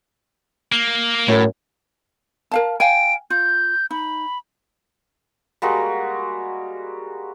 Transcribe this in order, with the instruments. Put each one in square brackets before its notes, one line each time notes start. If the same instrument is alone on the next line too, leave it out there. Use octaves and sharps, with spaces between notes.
[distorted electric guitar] A#3
[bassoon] F#2 [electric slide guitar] A2
[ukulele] A#4 F5 A5
[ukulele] F5 G5 G#5 [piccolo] D7
[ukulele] F4 [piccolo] G6
[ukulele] D#4 [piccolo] B5
[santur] G3 G#3 A#3 F#4